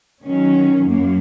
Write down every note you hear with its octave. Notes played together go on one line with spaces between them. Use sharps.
D#3 F#3 C#4
F#2 A#3